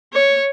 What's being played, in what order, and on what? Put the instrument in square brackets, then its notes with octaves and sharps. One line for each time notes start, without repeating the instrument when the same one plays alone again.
[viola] C#5